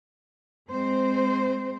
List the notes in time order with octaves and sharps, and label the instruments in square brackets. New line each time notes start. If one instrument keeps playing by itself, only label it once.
[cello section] G#3 C4 C5